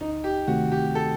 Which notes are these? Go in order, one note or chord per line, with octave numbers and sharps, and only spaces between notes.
D2 D#4
G4
C3 D#3 A3 C4 F#4
G4
A4